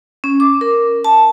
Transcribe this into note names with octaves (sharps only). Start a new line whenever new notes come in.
C#4
D6
A#4
A5